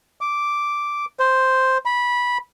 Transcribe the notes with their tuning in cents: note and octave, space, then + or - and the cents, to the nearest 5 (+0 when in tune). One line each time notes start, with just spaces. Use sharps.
D6 -5
C5 +0
B5 -15